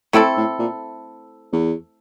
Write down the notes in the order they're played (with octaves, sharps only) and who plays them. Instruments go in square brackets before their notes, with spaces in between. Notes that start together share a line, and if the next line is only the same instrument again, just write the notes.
[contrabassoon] A2 [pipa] A3 C4 E4 A4
[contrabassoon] A2
A#2
E2